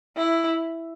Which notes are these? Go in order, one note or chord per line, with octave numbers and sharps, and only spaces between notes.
E4